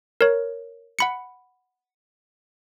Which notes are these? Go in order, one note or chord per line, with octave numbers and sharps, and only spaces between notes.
A#4 C#5
F#5 B5 C#7